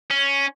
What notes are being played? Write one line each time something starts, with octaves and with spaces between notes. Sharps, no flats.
C#4